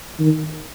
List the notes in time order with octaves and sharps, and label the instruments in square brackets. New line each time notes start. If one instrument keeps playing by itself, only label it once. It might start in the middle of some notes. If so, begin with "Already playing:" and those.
[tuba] D#3